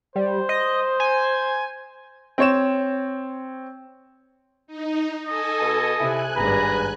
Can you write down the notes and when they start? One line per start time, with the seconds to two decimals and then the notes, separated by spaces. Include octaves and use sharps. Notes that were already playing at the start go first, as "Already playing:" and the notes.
0.16 G3 C5
0.49 D#5
1.00 G#5
2.38 C4 C#5 E7
4.67 D#4
5.26 A4 D#5 G#5
5.61 B2
6.00 C3 E4 G#5 F#6
6.36 G#1 G2 B4 A#5